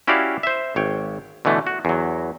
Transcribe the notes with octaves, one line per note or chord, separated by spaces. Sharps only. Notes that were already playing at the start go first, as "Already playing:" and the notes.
C#4 E4 F#4 G4 D5 F5
C5 E5
G#1 C#5 G5
B2 D3 E3 A3
F#4
E2 F#3